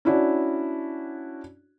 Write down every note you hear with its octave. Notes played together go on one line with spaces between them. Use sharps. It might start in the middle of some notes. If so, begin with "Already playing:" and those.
C#4 D4 E4 F#4 D5